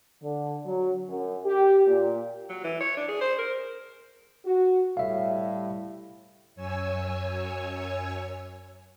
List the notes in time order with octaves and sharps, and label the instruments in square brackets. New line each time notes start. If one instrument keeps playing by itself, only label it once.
[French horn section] D3
F#3
F#2
G4
A#2
[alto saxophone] F#3
E3
C#5
D4
G#4
C5
A#4
[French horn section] F#4
[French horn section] A2 G3 [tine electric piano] E5 F5
[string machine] F#2 C#5 G#5 E6